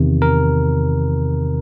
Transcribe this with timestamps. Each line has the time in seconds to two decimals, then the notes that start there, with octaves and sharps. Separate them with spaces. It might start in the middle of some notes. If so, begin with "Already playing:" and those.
Already playing: E2 C3 D#3
0.22 A#4